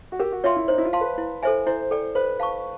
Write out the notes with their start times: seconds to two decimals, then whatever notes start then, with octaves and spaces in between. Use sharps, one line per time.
0.12 F#4
0.20 G4 A#4
0.32 F#4
0.44 F4 C#5 E5 G5 C6
0.56 E4
0.68 D#4 C5
0.78 E4
0.85 F4
0.93 F5 A5 C6
1.01 B4
1.18 E4
1.43 A4 C5 E5 G#5
1.66 E4 C5
1.91 A4 D5 G5
2.15 B4 C5
2.40 F5 A5 C#6